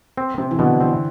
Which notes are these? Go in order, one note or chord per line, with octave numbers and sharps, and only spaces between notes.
C4
C3 C4
E3
B2 D3
E3 C4